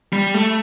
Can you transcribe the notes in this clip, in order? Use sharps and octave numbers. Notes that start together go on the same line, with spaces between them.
G3
A3